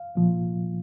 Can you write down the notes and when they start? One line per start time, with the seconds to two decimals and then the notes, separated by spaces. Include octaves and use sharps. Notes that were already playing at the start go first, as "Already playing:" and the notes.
Already playing: F5
0.15 C2 A#2 F3